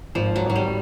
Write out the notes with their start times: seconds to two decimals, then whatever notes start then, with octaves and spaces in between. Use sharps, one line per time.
0.15 G#1 F3
0.36 F#3
0.46 G#1 F#3
0.56 G3